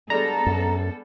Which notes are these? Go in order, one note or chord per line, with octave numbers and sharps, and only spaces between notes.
G3 G#3 B3 D4 A4 A#5
F#2